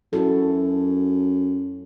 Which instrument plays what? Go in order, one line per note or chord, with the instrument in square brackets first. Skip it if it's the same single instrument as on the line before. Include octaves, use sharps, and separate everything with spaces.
[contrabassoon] F#2 [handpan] E4 F#4 A4